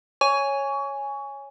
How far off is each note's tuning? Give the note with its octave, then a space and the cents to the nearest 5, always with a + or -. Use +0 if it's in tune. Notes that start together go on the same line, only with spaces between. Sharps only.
C#5 +0 G#5 +0 C#6 +25